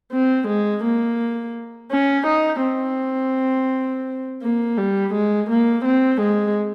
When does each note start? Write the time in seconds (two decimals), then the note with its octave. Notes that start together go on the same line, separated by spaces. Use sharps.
0.12 C4
0.48 G#3
0.84 A#3
1.91 C#4
2.26 D#4
2.63 C4
4.42 A#3
4.78 G3
5.14 G#3
5.49 A#3
5.85 C4
6.21 G#3